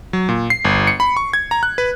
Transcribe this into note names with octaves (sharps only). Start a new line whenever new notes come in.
F#3
A#2
C7
G1
C#7
B5
C#6
G#6
A#5
F#6
B4